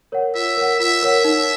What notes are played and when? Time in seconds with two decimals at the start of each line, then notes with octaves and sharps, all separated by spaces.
0.12 A#4 C#5 F#5
0.35 F4 E5
0.57 A#4 C#5 F#5
0.80 F4 E5
1.03 A#4 C#5 F#5
1.25 D#4